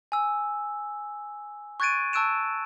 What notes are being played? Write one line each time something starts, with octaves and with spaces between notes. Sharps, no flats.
G#5 E6
C#6 F#6 G#6 A6 D7 D#7
A5 C#6 E6 F#6 D7 E7